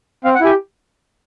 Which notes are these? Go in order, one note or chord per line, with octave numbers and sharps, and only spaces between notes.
C4 F5
F#5
E4 G4 G#5